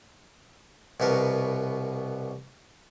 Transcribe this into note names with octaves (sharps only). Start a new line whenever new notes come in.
C2 B2 B3 A#4 C#6